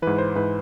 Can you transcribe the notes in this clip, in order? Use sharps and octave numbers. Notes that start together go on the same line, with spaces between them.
G#2 E3 B4
C5
G#2 E3 B4